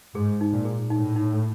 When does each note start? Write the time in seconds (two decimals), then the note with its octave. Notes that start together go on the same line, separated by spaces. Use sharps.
0.15 G#2 G#4
0.41 D#4
0.52 A#2
0.65 G#4
0.90 A2 D#4
1.16 D#4